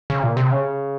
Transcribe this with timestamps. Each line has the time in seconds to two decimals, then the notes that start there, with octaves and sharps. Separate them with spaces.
0.10 C#3
0.23 A#2
0.37 C3
0.51 C#3